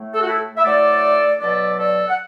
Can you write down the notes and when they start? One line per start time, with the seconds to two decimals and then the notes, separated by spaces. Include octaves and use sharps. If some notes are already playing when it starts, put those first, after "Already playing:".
Already playing: A2 A3
0.13 A4
0.21 F#4
0.28 E4 A4
0.57 E5
0.63 A2 F#3 A3 A4 D5
1.39 B2 F#3 A3 A4 D5
1.77 A4 D5
2.07 F#5